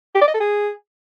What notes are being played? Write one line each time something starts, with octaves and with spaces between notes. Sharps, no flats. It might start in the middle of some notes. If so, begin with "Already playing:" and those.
G4
D5
D#5
A4
G#4